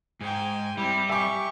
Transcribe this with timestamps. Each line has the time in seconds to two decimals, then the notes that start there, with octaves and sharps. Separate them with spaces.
0.21 G#2 G5 G#5
0.77 G3 C4 E4
1.09 G4 E5 G#5 C#6 D6